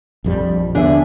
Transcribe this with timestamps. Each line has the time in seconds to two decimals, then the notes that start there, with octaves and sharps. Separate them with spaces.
0.24 A#1 F2 G3
0.75 D#2 D3 B3 D4 G#4 E5